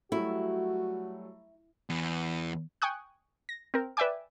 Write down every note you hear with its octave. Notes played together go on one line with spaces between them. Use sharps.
F#3 G3 A3 E4 F#4
E2
G5 G#5 C#6 D#6 F#6
A#6
C4 A#4
B4 D5 E5 G5 G#5 D6